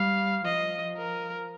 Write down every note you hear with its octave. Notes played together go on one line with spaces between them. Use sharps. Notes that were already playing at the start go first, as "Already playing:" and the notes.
Already playing: G3 F5
F3 D#5
A#4